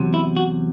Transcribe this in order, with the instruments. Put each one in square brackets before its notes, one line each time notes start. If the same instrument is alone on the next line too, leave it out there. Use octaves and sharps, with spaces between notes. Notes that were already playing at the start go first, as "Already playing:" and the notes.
Already playing: [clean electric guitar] E2 C3 F#3
E4
F#4